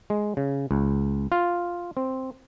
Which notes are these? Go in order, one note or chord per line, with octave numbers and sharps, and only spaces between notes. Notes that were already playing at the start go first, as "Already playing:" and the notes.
G#3
C#3
C#2
F4
C4